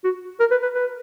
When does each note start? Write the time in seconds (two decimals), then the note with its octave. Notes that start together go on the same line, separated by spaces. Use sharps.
0.04 F#4
0.40 A#4
0.51 B4
0.62 B4
0.75 B4